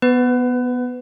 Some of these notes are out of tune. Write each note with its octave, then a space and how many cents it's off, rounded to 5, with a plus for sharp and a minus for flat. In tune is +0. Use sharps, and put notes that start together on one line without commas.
B3 +0 B4 +30